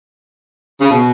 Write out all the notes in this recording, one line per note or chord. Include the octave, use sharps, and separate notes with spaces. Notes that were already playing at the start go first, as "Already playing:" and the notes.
C#3
B2